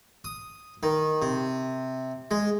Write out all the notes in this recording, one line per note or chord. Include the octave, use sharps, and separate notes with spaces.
D#6
D#3
C3
G#3